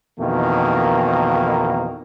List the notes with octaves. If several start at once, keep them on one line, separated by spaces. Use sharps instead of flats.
F2 B2 D#3 E3 A#3